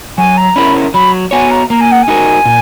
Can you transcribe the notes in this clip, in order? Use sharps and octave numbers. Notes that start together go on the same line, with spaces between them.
F#3 G#5
A#5
C#4 E4 A#4 B5
F#3 B5
B3 F#4 C#5 G#5
A#5
A#3 A#5
G#5
F#5
G#5
D#4 F#4 A#4
A#2